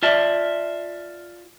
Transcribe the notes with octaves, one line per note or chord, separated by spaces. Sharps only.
F4 D5 E5 A5